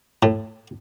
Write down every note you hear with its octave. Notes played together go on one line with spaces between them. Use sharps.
A2